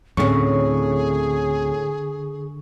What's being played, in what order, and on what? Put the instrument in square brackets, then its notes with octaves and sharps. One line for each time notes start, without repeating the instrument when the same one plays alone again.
[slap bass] D2 A#3 C4 [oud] A2 C#4 [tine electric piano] D3 C#6 [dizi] G#4